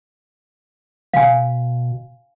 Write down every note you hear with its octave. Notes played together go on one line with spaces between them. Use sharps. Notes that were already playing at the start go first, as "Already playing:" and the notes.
B2 F5 G#5